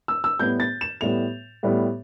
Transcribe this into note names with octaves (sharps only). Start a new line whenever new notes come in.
E6
E6
A2 G3 B3 G6
A6
E7
A2 G3 B3 F7
A2 G3 B3